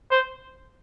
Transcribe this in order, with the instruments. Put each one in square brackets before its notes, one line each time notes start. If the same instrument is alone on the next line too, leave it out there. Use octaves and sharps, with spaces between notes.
[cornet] C5